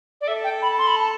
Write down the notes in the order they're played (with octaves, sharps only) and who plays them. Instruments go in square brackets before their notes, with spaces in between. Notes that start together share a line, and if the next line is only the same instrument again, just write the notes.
[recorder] D5
[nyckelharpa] A4 [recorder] E5
[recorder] G5
B5
C6
B5
A5